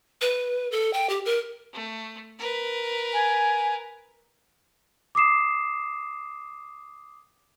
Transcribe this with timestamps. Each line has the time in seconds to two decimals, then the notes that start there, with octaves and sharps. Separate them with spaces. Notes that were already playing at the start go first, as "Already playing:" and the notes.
0.21 B4
0.72 A4
0.93 G5
1.09 G4
1.26 A#4
1.73 A3
2.39 A#4 B4
3.13 G#5
5.15 D6 D#6 C7 E7